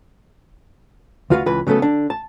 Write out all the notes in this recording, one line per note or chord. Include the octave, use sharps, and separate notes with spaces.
D2 D3 F4 F#4 B4 F5
C#2 E3 B4
C#3 F#3 A3 B3 A4
D3 D4
A5